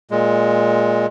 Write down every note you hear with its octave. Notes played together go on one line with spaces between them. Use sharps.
A#2 G#3